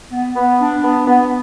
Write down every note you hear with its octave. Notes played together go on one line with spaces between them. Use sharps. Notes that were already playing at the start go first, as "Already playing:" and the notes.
B3
B3
D4
B3
B3